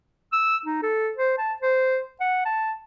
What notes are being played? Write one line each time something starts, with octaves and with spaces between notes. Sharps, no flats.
E6
D#4
A4
C5
A5
C5
F#5
A5